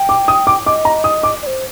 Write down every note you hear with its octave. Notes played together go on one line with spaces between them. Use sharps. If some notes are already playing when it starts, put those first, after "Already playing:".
Already playing: G5
D6
D#6
D6
D#5 D6
A#5
D#6
D6
D5
C5